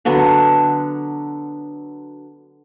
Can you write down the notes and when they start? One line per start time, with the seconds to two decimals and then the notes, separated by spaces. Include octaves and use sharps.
0.05 D3 F#3 B3 D4